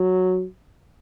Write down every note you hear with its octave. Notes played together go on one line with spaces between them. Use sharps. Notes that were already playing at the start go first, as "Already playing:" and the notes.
Already playing: F#3